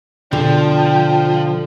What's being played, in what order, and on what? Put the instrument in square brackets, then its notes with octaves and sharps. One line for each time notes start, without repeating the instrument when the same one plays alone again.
[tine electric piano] B2 [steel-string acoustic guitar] D3 [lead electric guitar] F3 [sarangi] G5